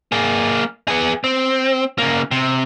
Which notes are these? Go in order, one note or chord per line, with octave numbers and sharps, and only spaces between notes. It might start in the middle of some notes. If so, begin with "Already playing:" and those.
A#3 G#4
B3 G#4
C4
C#3 A#3
C3